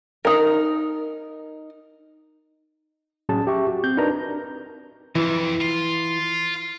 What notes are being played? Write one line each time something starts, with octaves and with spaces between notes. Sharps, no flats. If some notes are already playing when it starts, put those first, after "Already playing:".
D#4 A#4
A2 F#3 C#4 G#4 A5
G4 E5 C#6
F#4
C4 G6
D4 D#4 A#4 B4 A#5
F2 E3
F4